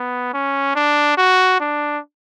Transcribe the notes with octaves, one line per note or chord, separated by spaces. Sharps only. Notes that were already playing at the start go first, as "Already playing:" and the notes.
Already playing: B3
C#4
D4
F#4
D4